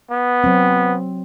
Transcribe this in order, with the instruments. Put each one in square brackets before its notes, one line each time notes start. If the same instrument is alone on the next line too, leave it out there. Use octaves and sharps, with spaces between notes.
[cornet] B3
[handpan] F#3 C4